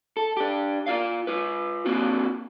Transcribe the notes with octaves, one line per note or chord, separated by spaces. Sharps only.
A4
D4 G4
F4 D5 F5
F4 B4
A#3 C4 D4 F4 F#4